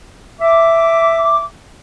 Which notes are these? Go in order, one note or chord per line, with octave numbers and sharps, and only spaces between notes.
E5 D6